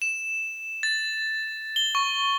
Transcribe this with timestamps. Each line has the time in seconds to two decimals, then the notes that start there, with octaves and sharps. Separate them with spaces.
0.02 E7
0.83 A6
1.76 G7
1.95 C#6